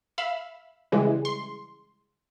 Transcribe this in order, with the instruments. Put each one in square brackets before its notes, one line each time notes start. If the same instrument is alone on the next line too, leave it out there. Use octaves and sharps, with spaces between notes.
[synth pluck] E5 F5 B5 E6
C#3 E3 G3 G#3
C6